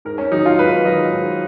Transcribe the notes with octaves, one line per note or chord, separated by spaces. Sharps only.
G#2 A#4
C#4
D#3 F#3 D#4
F4
G#2 B4
D#3 F#3 D#5
G#2